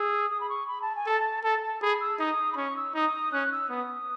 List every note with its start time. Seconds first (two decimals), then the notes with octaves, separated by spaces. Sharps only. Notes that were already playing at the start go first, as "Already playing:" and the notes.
Already playing: G#4 E6
0.31 D#6
0.41 B5
0.49 C#6
0.68 B5
0.82 A5
0.96 G#5
1.06 A4 A5
1.44 A4 A5
1.63 A5
1.82 G#4 B5
2.00 E6
2.19 D#4 D#6
2.52 B5
2.57 C#4 C#6
2.76 E6
2.95 D#4 D#6
3.32 C#4 F#6
3.52 E6
3.70 B3 D#6